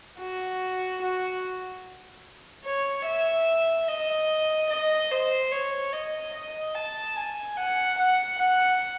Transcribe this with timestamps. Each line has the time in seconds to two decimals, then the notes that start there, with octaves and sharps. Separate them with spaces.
0.20 F#4
1.02 F#4
2.65 C#5
3.06 E5
3.88 D#5
4.70 D#5
5.11 C5
5.52 C#5
5.93 D#5
6.35 D#5
6.75 A5
7.15 G#5
7.57 F#5
7.98 F#5
8.39 F#5